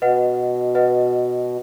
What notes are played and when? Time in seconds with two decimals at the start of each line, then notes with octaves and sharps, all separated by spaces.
0.02 B2 B4 D#5 F#5
0.75 B4 D#5 F#5